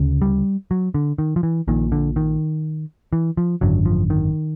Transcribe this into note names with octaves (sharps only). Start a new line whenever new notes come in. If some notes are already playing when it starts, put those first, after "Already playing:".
Already playing: D2 C#3
G3
F#3
D3
D#3
F3
E3
A#1 A#2 D#3
D3
D#3
E3
F3
G#1 F#2 D3 F#3
F3
D#3